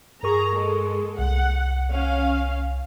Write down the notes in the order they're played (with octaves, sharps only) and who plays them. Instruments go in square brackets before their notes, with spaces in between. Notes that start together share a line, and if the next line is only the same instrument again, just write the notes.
[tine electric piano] G2 A#4 C#6 [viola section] G#4 A#5
[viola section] G#3 A4
[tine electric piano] C2 [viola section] F#5
[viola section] C#4 F5